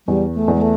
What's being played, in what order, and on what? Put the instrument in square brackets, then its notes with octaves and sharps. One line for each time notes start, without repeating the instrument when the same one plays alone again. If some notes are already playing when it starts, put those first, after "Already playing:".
[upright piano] E2 [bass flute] G3
[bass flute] A3
[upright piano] E2
[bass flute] G#3
A3